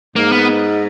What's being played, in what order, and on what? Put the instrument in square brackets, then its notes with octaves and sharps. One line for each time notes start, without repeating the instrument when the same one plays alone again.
[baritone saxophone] G#2 [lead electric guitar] A#3
[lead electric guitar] B3